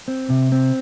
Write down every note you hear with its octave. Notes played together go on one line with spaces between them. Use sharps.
C4
C3
C4